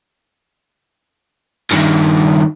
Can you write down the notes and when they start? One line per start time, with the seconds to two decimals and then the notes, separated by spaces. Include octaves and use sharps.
1.71 G2 D#3